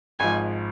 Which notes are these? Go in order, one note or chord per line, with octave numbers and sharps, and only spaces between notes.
G#1 G#2 F3 G#5